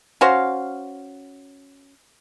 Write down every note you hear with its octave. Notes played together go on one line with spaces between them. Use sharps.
C#4 F#4 C5 F5